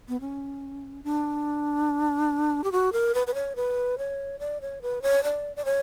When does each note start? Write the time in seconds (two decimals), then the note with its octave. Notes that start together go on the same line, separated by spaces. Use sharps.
0.09 B3
0.21 C#4
1.04 D4
2.64 G4
2.72 F#4
2.93 A#4
3.14 B4
3.27 B4
3.34 C#5
3.56 B4
3.98 C#5
4.39 D5
4.61 C#5
4.82 B4
5.02 C#5
5.24 D5
5.56 D5
5.65 C#5